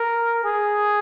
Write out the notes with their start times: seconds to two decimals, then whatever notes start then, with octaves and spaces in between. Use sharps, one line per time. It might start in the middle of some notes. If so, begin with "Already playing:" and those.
Already playing: A#4
0.44 G#4